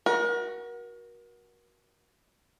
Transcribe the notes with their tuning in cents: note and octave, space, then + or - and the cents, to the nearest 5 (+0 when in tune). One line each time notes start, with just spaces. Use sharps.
F#4 +0 A#4 +35